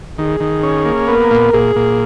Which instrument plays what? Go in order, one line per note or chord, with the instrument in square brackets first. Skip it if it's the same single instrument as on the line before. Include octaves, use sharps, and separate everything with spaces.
[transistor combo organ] D#3 [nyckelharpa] G#4
[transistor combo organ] D#3
C#4
A#3
[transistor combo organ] B3 [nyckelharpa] A#4
[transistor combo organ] A#2
[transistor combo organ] A#2 [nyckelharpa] G#4
[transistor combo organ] A#2